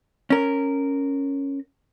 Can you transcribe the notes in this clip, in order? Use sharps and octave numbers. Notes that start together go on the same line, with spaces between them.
C#4 A#4